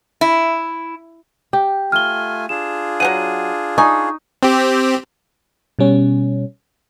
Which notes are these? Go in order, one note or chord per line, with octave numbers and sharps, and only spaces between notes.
E4
G4
A3 F4 G#5 F6 G7
D4 F4 G#4 E7
F#3 C#4 F#5 D#7
D#4 G#5 C#6
C4 G4
B2 G3 C#4